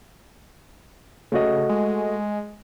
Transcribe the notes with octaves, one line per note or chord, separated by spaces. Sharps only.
C#3 A3 F#4 D#5
G#3